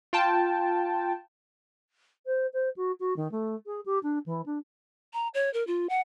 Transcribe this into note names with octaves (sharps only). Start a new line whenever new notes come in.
F4 G5 A5
C5
C5
F#4
F#4
D#3
A3
G#4
G4
D4
E3
D4
A#5
C#5
A#4
F4
F#5